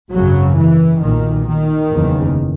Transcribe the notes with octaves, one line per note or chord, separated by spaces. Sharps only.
G#1 F#2 C#3 F#3
E3
B1 A#2 D#3
D#3
F#1 E2 C#3